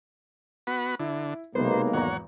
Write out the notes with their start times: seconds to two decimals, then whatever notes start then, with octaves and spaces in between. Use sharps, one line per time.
0.67 B3 F#4 B5
0.99 D3 E4
1.55 B1 C3 G#3 A#3 B3 C5
1.93 G#1 E2 C#5 F#5 A#5